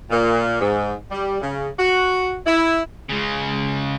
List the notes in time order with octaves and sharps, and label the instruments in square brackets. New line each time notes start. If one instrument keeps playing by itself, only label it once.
[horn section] A#2
G#2
G3
C#3
F#4
E4
[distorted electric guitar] C#3 G#3